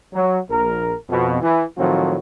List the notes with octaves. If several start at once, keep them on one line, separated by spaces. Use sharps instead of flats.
F#3
A#1 A#4
F2 B2
E3
A2 D#3 F3 F#3 C4 F#4